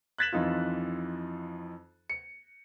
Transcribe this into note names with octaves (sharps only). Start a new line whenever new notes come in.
F#6 G#6 A6 B6 E7 F#7
F2 E3 D#4 F4
C#7